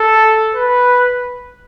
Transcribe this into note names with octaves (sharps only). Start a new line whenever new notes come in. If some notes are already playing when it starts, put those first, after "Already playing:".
Already playing: A4
B4